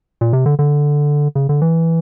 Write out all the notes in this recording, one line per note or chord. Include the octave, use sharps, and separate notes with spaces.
A#2
C3
D3
D3
C#3
D3
E3